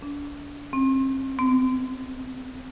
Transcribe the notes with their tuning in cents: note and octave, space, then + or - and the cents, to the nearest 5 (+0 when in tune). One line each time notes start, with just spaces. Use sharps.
D4 -35
C4 +35
C4 -35